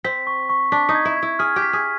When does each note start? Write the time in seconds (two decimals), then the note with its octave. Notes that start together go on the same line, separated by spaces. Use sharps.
0.05 C4 B6
0.27 C#6
0.50 C#6
0.72 D4 B6
0.89 D#4
0.95 G#6
1.05 E4
1.17 G#6
1.22 E4
1.39 G#4 F6
1.56 G4
1.62 B6
1.73 G#4